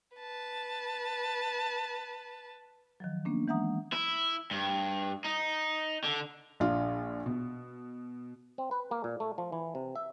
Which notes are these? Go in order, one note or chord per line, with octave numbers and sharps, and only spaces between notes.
B4 A5
D#3 F3 F#3
A#3 B3 C#4 D4
E3 G#3 E5 F#5 A#5 D#6
E4
G2
D#4
D3
A#1 D4 F4
B2
C4
B4
A#3
A#2
A3
F3
E3
C3
E5